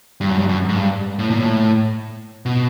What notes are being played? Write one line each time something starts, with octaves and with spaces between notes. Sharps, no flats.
G2
F#2
G2
F#2
G#2
G2
A2
A#2
A2
B2